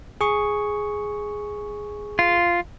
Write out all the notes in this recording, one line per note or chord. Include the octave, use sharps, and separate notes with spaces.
G#4 C#6
F4